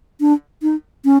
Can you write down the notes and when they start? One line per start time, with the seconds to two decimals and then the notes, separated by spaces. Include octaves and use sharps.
0.21 D4
0.63 D#4
1.05 C#4